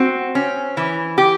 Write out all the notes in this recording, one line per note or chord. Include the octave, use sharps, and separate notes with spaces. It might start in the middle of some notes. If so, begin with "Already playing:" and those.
Already playing: C4 F#4
C#4
E3
G4